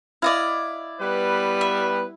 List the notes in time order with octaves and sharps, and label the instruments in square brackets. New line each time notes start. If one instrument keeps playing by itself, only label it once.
[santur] E4 [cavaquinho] D5 D#5 F5
[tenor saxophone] G3 [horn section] B3 B4
[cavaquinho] E5